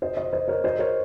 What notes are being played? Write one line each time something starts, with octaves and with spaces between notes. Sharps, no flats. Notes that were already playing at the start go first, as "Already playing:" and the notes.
C5 D#5
C5 D#5
C5 D#5
A#4 C#5
C5 D#5
A#4 C#5